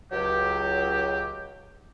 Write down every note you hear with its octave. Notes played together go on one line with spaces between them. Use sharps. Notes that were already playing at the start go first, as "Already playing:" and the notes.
C#2 F#3 G4